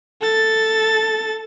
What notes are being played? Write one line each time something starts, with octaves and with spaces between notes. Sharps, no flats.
A4 A6